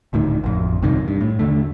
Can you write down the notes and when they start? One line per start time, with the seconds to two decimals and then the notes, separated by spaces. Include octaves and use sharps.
0.13 D#1 D2 A2 D#3
0.44 A1 F2
0.82 B1 G2 C3 D#3
1.08 G2
1.21 A2
1.39 D#2 D3 A3